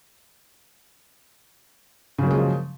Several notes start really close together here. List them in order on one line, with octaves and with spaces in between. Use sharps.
C#3 F#3 A#3 G#3 F3